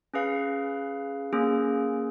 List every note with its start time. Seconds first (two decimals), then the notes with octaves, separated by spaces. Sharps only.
0.14 C#4 G#4 B4 F5
1.33 A#3 C#4 G#4